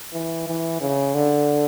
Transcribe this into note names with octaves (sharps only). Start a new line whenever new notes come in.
E3
E3
C#3
D3